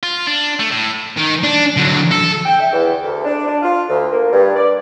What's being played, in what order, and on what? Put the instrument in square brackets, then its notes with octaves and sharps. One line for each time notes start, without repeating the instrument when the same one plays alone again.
[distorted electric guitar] F4
D4
A3
A2
D#3
D4
D3 F#3
A4
[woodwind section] G5
E5
E2
D2
D4
D4
F4
D2
A#3
G2
D5